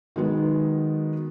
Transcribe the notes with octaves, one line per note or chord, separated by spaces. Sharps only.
D#3 F#3 G#3 B3